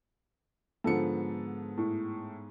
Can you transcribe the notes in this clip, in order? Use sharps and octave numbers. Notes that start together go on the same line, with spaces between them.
G#2 D3 F3 B3 A4 C#7
A2